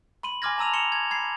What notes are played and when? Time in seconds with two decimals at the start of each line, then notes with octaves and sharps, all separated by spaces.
0.23 B5 C6 D#7 F#7
0.42 G#5 C6 D6 F6 G#6 A#6
0.58 A5 A#5 E6 D#7 F7
0.73 C6 C#7 E7 F7 G7
0.92 G#6
1.11 B5 G#6 C7